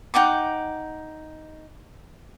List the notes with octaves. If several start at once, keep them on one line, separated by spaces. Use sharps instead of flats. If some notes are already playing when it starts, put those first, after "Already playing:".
D#4 F#5 G5 D6